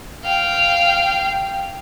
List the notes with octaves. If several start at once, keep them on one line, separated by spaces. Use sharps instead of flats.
F5 G5